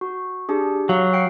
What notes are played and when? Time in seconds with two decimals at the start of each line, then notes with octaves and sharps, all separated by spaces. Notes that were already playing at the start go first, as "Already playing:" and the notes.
0.01 F#4
0.49 D4 G4 G#4
0.89 F#3 F5
1.13 F#5 G5 C7